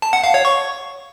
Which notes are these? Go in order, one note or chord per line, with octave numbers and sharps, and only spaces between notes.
A5
F#5
F5
C#5
C#6